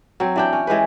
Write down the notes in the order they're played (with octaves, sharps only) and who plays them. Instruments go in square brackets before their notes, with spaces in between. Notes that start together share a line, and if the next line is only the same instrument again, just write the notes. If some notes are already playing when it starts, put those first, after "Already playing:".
[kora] F#3 C4
E3 D4 G5
C#4
E3 G#3 G4 B4